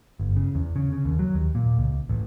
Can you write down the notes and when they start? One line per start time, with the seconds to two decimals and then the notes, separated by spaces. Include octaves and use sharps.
0.19 G1
0.37 C#3
0.55 E2
0.76 C#3
0.93 C#3
1.05 D#2
1.19 F#3
1.34 D#2
1.55 A#2
1.79 C#2
2.09 A1